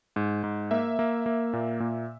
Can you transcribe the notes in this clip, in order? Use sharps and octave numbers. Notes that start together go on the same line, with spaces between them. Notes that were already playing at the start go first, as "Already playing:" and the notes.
G#2
G#2
A#3 E5
A#3
A#3
A#2
A#2